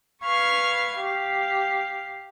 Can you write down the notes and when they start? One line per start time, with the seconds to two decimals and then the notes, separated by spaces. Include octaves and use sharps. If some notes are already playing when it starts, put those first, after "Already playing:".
0.24 B4 F5 C#6 F6 G#6
0.95 G4 F5